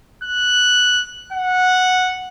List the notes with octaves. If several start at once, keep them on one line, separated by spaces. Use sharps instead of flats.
F#6
F#5